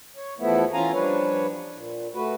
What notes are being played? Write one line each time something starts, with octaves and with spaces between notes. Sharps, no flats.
C#5
E2 F3 A3 B3 E4
E3 C#4 F4 F5 G#5 A#5
F3 G3 D4 B4 C#5
A#2
A3 F#4 B4